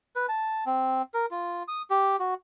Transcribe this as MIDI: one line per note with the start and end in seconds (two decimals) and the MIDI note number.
0.16 0.26 71
0.29 0.64 81
0.66 1.02 60
1.14 1.26 70
1.31 1.63 65
1.68 1.82 87
1.90 2.16 67
2.20 2.34 66